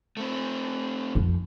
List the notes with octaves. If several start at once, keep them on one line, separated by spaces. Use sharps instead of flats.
A3 C4
F2